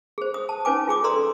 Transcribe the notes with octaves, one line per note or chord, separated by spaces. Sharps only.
G#4 C5
D#6
A5
C#4 D#4 B4 G#5 D6
F4 G#4 D6 D#6
A4 D5 A#5 C6 D#6 E6